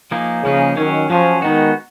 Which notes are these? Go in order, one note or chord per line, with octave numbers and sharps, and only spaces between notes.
F3 A#3 D#4 G#4
C#3 F3 A#3 D#4 G#4
D#3 F#3 C#4 G#4 C#5
F3 F#3 C#4 G#4 C#5
D#3 G#3 B3 D#4 F#4